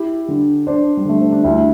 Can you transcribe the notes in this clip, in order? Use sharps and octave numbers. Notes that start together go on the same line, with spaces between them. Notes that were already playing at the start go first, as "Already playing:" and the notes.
Already playing: E4 G4
D3
D4 C5
G3
D3 A3
C4
D4
D2 E4